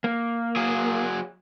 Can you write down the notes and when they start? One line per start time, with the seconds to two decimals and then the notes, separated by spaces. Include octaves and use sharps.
0.04 A#3
0.56 F#3 G#4